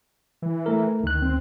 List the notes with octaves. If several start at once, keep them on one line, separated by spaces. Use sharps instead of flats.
E3
A3 A#4
D2 D#3 F#6
C4